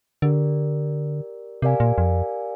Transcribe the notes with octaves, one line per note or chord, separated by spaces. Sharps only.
D3 G4 A#4 D5
C3 G4 A#4 D5 F5 G#5
A#2
F2